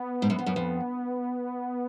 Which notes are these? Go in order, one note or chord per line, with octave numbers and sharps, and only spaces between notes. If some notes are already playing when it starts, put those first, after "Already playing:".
Already playing: B3
G#2
F#2
F2
F#2
F2